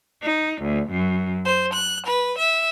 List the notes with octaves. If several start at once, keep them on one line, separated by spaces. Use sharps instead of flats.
D#4
D2
F#2
C5
F#6
B4
E5